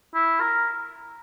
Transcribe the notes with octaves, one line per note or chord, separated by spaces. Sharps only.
E4
A#4